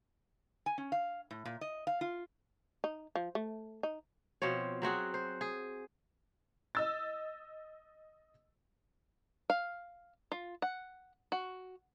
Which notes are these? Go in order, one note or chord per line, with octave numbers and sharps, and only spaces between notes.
G#5
C#4
F5
A2
A#2
D#5
F5
F4
D#4
F3
A3
D#4
B2 F3 C4 C#5
F#3 C4 F#4 G#4
C5
G#4
D#5 E6 A6
F5
F4
F#5
F#4